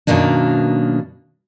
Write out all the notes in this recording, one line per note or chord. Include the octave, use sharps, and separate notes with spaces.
F#2 B2 D#3 A#3 D4